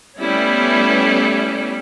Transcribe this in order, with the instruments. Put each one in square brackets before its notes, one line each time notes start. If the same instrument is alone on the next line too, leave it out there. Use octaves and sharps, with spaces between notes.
[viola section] G3 A3 B3 C#4 E4